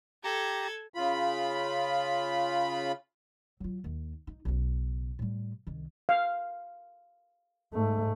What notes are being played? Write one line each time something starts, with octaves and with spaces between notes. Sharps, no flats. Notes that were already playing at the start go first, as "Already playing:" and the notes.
G4 A4 A#5 G#6
C#3 F4 B5
F#3 F4
D#2
D#4
B1 C#3
A2 G3
C2 D#3
F5
G#2 A3